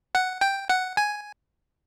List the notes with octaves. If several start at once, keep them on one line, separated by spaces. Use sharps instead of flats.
F#5
G5
F#5
G#5